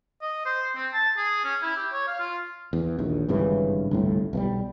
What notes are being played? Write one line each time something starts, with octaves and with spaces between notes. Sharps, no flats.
D#5
C5
C4
A5
G#4
C#4
E4
G4
C#5
F5
F4
E2
A#1 D#2
G#1 G2 C#3 E3
G1 C2 A2
B1 E3 G3